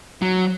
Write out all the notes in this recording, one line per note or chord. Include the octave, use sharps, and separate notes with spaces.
F#3